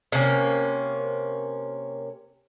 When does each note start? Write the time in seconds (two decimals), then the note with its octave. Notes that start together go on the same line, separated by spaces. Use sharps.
0.12 C3 A#3 C#4